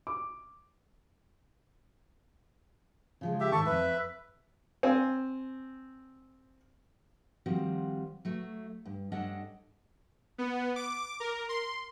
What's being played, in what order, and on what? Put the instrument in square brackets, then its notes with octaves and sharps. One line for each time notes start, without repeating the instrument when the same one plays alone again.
[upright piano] D6
[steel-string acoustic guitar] C#3 F3 G#3
[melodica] G4 E5
[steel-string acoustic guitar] G#2 D#3 [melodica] A4 A5 C#6
[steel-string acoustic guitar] F2 G#2 [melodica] B4 E5
[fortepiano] C4 G#5
[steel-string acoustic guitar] D#3 F3 G3 C4 F#4
F#3 A3
G2
G2 C#4 D4 A4 D#5 F#5
[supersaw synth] B3
D6
A#4
C6